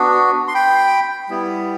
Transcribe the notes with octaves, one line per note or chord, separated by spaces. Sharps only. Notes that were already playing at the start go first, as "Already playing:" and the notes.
Already playing: B3 D4 F#4
C6
G5 B5
G3 B3 E4